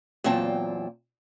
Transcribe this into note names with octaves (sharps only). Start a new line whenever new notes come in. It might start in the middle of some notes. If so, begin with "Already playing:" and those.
E2 A#2 F#3 C4 G5 A5